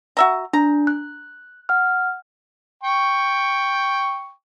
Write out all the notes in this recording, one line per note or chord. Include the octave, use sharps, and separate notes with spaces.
F#4 E5 A#5
D4 A#5
F#6
F#5 F6
G5 C#6